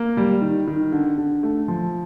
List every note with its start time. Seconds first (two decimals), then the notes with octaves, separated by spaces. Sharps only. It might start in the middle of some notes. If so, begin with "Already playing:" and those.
Already playing: A#3
0.17 G3
0.42 D#3
0.68 D#3
0.92 D3
1.18 D3
1.43 A3
1.68 F3